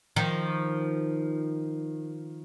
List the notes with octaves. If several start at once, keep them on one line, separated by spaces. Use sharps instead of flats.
D#3 F3